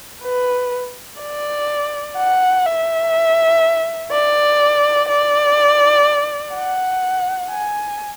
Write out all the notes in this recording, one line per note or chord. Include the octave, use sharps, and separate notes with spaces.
B4
D5
F#5
E5
D5
D5
F#5
G#5